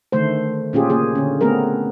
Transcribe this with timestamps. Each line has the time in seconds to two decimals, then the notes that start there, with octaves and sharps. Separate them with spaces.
0.12 D3 D#3 A3 C5
0.73 A#2 C#4 F4 G4 G#4
0.90 C#3 A#3 G#4
1.15 D3 C#4
1.41 A3 B3 C4 G#4 A#4